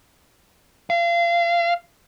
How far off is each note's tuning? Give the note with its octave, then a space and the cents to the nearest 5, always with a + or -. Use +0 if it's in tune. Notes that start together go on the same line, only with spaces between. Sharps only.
F5 -30